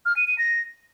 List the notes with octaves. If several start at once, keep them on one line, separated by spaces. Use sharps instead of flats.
F6
D#7
D#7
A#6